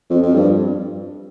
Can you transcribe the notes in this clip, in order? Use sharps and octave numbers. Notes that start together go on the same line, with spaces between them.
F2
F2
G2